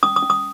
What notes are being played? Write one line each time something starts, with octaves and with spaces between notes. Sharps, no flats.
C#4 D#6
D#6
C#4
D#6